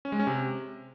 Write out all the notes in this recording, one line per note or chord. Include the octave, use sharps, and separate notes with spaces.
C#4
G#3
C#4
C3